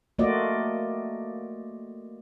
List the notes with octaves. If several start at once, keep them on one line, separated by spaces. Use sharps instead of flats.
A3 A#3 F4 F#4 D5 D#5